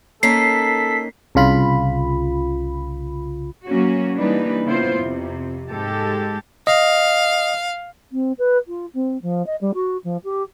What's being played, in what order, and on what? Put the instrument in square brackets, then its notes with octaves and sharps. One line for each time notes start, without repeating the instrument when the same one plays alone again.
[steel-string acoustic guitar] A#3 C#4 D#4 [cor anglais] A4 [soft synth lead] B6 [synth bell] C7
[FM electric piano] C2 C#3 F4 B5
[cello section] F#3 A#3 C#4 F#4
E3 G3 A#3 D4 D#4 B4
C#3 A#3 B3 E4 F4 C5
F2 C3
G#2 G#3 G4 A4
[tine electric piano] D#5 [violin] F5
[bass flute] C4
B4
F4
C4
F3
D#5
G3
F#4
F3
G4